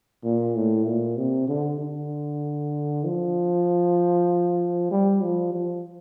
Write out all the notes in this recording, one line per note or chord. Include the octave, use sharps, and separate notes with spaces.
A#2
A2
A#2
C3
D3
D3
F3
G3
F3
F3